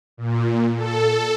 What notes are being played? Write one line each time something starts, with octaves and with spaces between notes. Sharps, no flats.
A#2
A4